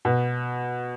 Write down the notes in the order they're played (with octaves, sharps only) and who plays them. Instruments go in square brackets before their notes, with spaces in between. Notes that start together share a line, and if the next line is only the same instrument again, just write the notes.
[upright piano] B2